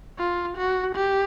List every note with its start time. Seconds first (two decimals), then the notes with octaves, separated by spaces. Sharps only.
0.19 F4
0.57 F#4
0.95 G4